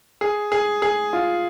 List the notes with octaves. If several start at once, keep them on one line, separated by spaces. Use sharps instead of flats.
G#4
G#4
G#4
F4